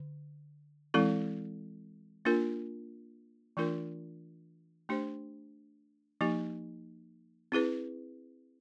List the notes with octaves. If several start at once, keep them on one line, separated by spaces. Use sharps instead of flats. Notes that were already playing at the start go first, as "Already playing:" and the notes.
Already playing: D3
E3 G#3 C4 E4 A4
A#3 D4 F4 A#4
E3 A3 D4 F4 A#4
A3 D4 G4 C5
F3 A#3 D#4 G4
C4 E4 G#4 B4